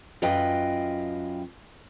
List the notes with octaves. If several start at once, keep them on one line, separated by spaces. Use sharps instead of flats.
F#2 F4 B4 D#5 G5